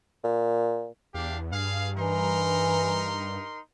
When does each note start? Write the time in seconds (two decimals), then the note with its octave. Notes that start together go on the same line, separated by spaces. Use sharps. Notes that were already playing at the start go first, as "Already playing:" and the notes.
0.24 A#2
1.14 E2 D4 G4 F5
1.52 G2 G#4 F5
1.97 E3 D#4 A#4 C6